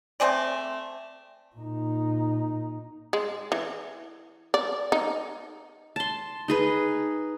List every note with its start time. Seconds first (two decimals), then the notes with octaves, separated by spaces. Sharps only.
0.20 A3 C4 G#4 D5
1.56 A#2 D#4
3.13 G#3
3.52 E3
4.54 D5
4.92 D#4
5.96 A5 C6
6.48 D#4 G#4 B4